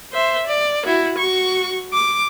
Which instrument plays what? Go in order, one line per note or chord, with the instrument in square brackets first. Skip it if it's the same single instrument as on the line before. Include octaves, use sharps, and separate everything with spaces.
[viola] C5 E5
D5
E4 F#4
F#4 C#6
D6